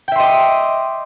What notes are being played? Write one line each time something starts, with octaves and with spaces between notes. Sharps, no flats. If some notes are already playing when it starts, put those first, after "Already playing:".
D#5 E5 G5 C6 D6